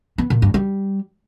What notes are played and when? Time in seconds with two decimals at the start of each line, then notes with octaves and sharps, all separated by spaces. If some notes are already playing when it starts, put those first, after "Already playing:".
0.18 B3
0.30 A#2
0.42 G2
0.54 G3